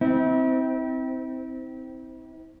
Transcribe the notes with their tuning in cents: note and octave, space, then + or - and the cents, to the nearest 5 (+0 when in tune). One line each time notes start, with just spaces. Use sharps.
C4 -10 E4 -40